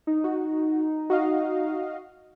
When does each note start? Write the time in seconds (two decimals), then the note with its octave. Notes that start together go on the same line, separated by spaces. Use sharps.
0.07 D#4
0.24 F#4
1.10 F#4 D#5 F5